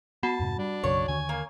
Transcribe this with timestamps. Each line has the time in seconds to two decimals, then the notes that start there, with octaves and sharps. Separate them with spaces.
0.23 B3 F#4 F#5 A5 B5
0.39 F2 G#2 C3
0.59 G3 D4
0.84 B1 F#2 C#3 C#5
1.08 D#2 D3 G#5
1.29 A#3